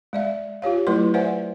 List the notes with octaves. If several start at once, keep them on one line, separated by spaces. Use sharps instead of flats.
G#3 D5 E5
F4 G4 C#5 F5
F#3 A3 E4 B4 C6
B4 C5 D5 E5 F#5 G#5